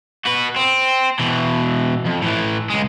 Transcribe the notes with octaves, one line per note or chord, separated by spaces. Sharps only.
F#4 B4
C4
B2 E3
F2
A2 E3
C#2 G#3